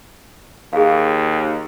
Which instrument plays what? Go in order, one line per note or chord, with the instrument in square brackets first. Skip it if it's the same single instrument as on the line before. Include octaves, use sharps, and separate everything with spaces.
[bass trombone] D#2 [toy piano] G#4 F5